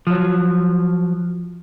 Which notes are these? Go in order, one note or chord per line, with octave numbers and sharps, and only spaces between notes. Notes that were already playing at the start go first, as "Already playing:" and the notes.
F3 F#3